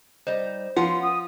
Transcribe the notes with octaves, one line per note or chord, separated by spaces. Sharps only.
G3 D#4 C5
F3 B3 C#4 F#5 C6
D#6